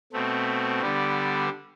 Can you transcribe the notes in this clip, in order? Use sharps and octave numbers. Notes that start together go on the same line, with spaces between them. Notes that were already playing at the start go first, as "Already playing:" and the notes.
B2 A3 C4
D3 G3 B3 D4